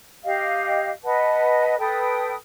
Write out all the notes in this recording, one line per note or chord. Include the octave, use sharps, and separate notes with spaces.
G4 D#5 F5
B4 D#5 F#5 A5
A4 B4 G5 D#6